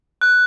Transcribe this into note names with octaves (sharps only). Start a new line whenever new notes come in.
F#6